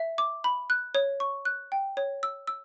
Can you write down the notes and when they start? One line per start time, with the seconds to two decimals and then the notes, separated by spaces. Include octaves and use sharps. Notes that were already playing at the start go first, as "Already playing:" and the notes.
Already playing: E5
0.18 D6
0.44 B5
0.70 F#6
0.95 C#5
1.20 C#6
1.45 F#6
1.72 G5
1.97 C#5
2.23 E6
2.47 E6